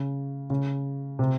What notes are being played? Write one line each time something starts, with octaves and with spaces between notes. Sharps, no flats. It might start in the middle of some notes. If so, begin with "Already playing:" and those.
Already playing: C#3
C#3
C3